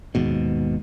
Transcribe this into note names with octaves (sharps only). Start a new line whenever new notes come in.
D#2 G#2 B2